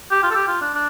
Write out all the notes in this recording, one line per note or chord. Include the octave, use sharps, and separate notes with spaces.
G4
F4
A4
G4
F4
D4
D4